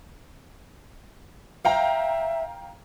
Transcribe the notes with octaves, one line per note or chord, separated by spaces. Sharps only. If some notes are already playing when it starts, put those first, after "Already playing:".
E5 F5 G5 A#5